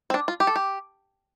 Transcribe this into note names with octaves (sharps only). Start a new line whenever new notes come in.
C4
D4
F4
G4
A4
G4